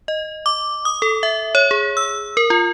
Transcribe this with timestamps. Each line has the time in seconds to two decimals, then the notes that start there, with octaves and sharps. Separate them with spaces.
0.08 D#5
0.46 D6
0.85 D#6
1.02 A4
1.23 E5
1.55 C#5
1.71 G#4
1.97 E6
2.37 A#4
2.50 F4